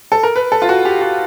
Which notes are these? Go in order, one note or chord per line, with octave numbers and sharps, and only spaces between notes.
A4
A#4
B4
A4
F4
F#4
G4
F#4